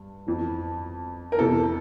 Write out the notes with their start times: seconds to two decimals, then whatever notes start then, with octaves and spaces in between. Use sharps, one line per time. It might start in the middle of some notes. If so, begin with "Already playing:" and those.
Already playing: G2
0.27 F2 E3
1.32 A#4
1.38 F2 C3 E3 A4